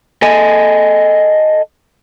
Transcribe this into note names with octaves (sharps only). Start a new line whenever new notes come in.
A4 D#5 G#5